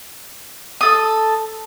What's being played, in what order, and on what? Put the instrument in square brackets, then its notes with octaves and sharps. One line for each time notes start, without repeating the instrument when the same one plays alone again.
[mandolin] A4 D#6